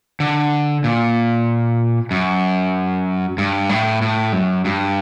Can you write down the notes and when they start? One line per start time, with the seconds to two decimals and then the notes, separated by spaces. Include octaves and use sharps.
0.20 D3
0.84 A#2
2.11 F#2
3.38 G2
3.69 A2
4.02 A2
4.33 F#2
4.65 G2